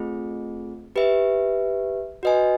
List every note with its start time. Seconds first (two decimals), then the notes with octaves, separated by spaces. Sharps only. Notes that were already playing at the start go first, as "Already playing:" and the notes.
Already playing: A3 C4 F4 G#4
0.96 G4 B4 E5
2.23 F#4 B4 D#5 G#5